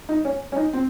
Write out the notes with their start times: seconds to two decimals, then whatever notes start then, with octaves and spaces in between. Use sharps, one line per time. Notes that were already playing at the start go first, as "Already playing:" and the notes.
0.09 D#4
0.25 C#4
0.52 C#4
0.56 D#4
0.73 C4